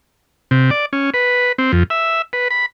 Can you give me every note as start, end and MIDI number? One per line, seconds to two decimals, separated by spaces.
0.51 0.70 48
0.71 0.86 74
0.93 1.10 61
1.14 1.52 71
1.58 1.72 60
1.72 1.83 41
1.90 2.22 76
2.33 2.48 71
2.50 2.66 83